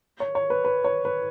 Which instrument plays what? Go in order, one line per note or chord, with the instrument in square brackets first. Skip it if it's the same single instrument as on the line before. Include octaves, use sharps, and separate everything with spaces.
[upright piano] C#5
C#5
B4
B4
C#5
B4